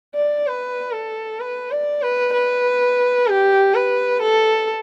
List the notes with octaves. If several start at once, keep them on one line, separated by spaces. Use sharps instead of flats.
D5
B4
A4
B4
D5
B4
B4
G4
B4
A4